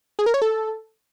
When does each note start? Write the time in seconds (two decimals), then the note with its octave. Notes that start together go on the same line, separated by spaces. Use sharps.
0.19 G#4
0.26 A#4
0.34 C#5
0.42 A4